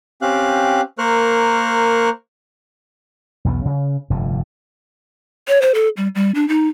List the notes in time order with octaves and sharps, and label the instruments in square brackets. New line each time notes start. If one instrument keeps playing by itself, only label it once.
[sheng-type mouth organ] C4 C#4 G4 F5 F#6
A#3 A#4 C5 C#6 F6 F#6
[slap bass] B1 E2 G3 B3
C#3
F1 G2 D3
[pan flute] C#5
C5
A4
G3
G3
D4
D#4